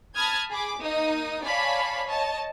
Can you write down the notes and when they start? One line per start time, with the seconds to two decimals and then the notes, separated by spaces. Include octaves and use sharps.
0.15 A5 B5 D#6 F6 G#6
0.50 G#4 B5 D6
0.79 A#3 D#4 D#6
1.45 C#5 D5 F5 G#5 A5 B5
2.07 C#5 D#5 A5